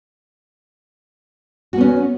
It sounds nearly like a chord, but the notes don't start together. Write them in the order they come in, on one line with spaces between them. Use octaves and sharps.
F#4 A#3 B3 C#4